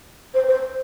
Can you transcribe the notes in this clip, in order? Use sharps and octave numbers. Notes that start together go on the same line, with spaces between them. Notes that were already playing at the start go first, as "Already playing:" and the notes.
C5
C5